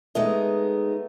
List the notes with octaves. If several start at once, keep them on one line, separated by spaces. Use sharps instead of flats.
G#3 A3 B3 D#4